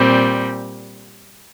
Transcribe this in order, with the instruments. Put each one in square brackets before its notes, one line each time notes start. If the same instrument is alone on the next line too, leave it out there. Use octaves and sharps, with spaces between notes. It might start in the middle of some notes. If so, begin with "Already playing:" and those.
Already playing: [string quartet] A#2 G3 C4